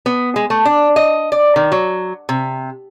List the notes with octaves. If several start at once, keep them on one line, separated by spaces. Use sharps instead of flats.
B3
G#3
A3
D4
D#5
D5
D#3
F#3
C3